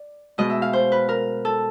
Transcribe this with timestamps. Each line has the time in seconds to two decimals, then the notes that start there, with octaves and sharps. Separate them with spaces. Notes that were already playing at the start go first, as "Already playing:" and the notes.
Already playing: D5
0.38 B2 G#3 D#5
0.50 E5
0.62 F5
0.73 C5
0.92 B4
1.09 A#4
1.45 A4